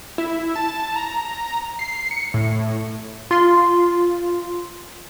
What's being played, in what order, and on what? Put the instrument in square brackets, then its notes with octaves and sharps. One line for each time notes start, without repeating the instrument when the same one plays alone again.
[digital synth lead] E4
A5
A#5
C7
C#7
A2
[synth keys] F4 C6